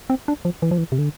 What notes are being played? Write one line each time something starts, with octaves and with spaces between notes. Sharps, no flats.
C4
D4
F3
E3
F3
E3
C3
D3